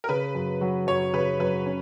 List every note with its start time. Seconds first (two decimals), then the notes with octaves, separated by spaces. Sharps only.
0.04 A#4
0.09 C#3 B4
0.35 F#2
0.61 F#3
0.87 F#2 C#5
1.13 C#3 B4
1.40 F#2 B4
1.66 C#4